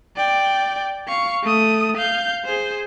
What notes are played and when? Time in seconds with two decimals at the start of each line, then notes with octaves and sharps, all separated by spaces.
0.17 D5 G5
1.08 F5 C#6
1.43 A3 D#6
1.97 F5 G6
2.45 G#4 C5